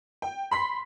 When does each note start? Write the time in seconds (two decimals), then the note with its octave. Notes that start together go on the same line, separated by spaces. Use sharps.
0.22 G5
0.51 B5 C6 B6